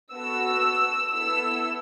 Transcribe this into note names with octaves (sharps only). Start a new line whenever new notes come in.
B3 F#4 A4 E6
B3 E4 A4 E6